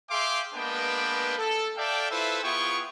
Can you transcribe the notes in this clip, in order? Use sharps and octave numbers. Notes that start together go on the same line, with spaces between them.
G#4 E5 F5 G5 C6 D6
G#3 A#3 B3 D4 B4 G5
A4
A4 D5 E5 F5 G5
E4 F4 A4 B4 C5 E5
B3 E4 F4 G#4 G5 C#6